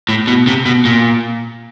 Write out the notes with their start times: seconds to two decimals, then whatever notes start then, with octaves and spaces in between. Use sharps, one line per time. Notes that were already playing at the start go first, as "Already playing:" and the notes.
0.09 A2
0.27 B2
0.47 C3
0.66 B2
0.85 A#2